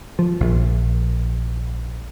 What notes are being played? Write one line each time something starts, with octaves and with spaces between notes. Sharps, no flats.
F3
A#1